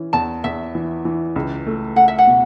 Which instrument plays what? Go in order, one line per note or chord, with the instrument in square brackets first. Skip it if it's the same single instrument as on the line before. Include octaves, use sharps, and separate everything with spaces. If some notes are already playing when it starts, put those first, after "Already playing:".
Already playing: [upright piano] E3 C#4
[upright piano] E2 [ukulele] A5
[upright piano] E2 [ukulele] E5
[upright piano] E3
E3
C#2
A3
[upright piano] A3 [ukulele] F#5
[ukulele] E5
F#5
[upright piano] B2